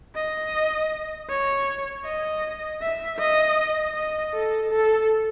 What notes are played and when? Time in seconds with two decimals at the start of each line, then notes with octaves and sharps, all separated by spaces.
0.16 D#5
1.30 C#5
2.06 D#5
2.82 E5
3.19 D#5
3.95 D#5
4.34 A4
4.71 A4